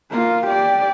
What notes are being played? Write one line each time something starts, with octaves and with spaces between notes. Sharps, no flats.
A#3 F4
G4 D5